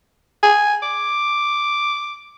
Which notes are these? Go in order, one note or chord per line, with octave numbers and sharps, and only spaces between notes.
G#5
D6